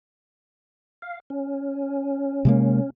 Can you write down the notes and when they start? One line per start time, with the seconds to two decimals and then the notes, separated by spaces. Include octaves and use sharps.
1.02 F5
1.30 C#4
2.45 C3 G#3 A#3